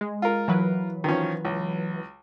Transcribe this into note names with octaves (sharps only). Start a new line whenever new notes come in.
G#3
F4 A#4
E3 F#3 B4
D#3 F3 C#4
C#2